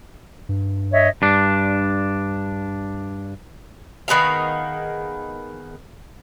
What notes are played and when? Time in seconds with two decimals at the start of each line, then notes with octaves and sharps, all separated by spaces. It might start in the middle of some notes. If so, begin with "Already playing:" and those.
0.49 G2
0.92 C#5 D#5 E5
1.22 G2 D4
4.08 D#3 B3 G#4 F5